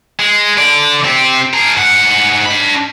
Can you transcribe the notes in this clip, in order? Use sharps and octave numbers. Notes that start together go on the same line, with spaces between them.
G#3
D3 D5
C4 G4
G#4 A#4
G#2 F#5
D4 B5